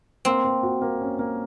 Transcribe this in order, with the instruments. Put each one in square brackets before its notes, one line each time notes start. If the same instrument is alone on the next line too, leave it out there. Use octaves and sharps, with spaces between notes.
[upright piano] A#3 [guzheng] C4
[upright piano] A#3
F#4
A#3
C#4
A#3